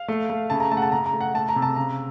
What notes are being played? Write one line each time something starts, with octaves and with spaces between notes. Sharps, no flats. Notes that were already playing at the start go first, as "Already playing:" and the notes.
Already playing: F5
A3
A3
C#3 A5
A#5
A3 A5
F#5
A5
C#3 A#5
A#5
A3
F#5
A3 A5
A#5
C3
A5
C#3 A#5